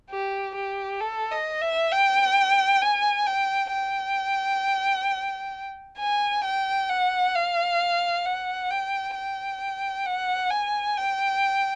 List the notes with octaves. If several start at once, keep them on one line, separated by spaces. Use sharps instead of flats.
G4
G4
A4
D#5
E5
G5
G#5
G5
G5
G#5
G5
F#5
F5
F#5
G5
G5
F#5
G#5
G5